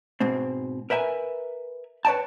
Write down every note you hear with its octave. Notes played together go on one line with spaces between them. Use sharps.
G#2 B2 C4
A#4 B4 E5 G5 G#5
B4 C#5 D#5 G5 A5